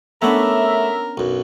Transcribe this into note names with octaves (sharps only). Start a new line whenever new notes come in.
A3 B3 C#4 D4 A#4 E5 F#5
B1 F#2